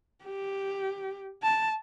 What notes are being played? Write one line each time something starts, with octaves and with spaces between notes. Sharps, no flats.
G4
A5